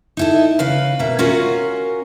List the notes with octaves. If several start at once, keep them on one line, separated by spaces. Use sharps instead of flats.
D#4 E4 A4
C#3 B4 F5
B2 A#3 E5
C#4 F4 F#4 A#4